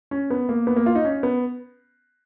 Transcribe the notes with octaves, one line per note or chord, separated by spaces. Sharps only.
C#4
B3
A#3
B3
A#3
F4
D#4
C#4
B3